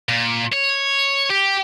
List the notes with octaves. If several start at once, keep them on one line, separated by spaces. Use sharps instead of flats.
A#2
C#5
G4